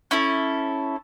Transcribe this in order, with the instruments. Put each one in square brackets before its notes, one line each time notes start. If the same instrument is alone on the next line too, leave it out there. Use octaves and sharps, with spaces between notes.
[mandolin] C#4 E4 A4